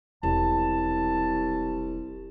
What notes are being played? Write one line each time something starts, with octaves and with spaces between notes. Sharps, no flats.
E1 C2 A5